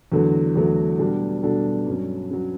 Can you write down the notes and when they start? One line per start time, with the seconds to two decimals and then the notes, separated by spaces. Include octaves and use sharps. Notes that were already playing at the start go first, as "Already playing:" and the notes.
0.12 E2 D3 F#3 A3
0.55 E2 D3 F#3 A3
0.99 B2 G3 D4 F#4 A4
1.43 B2 G3 D4 F#4 A4
1.87 G2 F#3 C#4
2.31 F#3 C#4